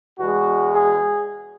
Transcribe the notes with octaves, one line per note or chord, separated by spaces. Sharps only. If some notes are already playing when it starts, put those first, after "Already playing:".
E2 B2 G#3 F#4
G#4